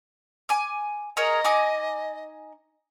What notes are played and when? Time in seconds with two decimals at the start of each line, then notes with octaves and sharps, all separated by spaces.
0.49 G#5 D6
1.17 G#4 A#4 C#5 D#5
1.44 D#4 G#5 D6